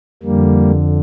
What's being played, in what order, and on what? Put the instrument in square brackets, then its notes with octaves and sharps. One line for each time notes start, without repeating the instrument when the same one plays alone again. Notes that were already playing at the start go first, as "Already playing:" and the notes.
[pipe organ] F2 D3 G3 A#3